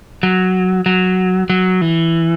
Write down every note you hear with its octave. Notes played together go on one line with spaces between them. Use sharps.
F#3
F#3
F#3
E3